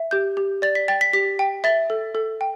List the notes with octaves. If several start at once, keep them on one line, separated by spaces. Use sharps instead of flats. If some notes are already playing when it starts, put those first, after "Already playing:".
Already playing: E5
G4 G6
G4
D5 A6
B6
G5 A6
B6
G4 B6
G5
E5 A6
A4
A4
G5